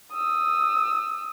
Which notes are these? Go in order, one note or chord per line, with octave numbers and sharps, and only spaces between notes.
D#6 E6